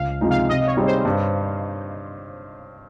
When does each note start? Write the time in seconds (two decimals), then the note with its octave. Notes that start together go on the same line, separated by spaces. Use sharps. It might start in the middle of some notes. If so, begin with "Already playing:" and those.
Already playing: C#2 F5
0.21 C3 F3 G#3 D#4
0.31 F5
0.49 C3 D#5
0.67 C#5
0.77 G3 C4 D#4 G#4
0.87 C5
1.05 G2